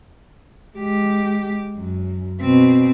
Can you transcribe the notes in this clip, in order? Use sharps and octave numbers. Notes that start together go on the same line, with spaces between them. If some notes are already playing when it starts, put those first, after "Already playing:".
G#3 G4
F#2
B2 C4